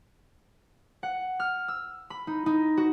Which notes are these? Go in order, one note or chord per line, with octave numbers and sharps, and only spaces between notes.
F#5
F6
E6
B5
D#4
D#4
F#4